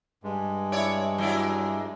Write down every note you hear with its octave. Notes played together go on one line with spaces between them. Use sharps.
G2 G#3
E4 C#5 D5
F#3 E4 D5